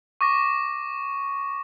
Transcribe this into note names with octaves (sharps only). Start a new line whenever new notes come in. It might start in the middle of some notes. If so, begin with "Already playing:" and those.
C#6 D6 A#6